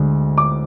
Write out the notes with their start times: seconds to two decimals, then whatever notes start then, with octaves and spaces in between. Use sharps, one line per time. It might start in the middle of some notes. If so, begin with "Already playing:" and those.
Already playing: D2 D3 G#3
0.38 D6